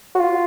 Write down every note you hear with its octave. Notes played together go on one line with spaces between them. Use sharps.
F#4
F4